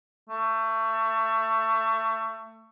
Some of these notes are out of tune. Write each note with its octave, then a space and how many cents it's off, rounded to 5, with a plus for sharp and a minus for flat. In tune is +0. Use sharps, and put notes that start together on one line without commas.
A3 +25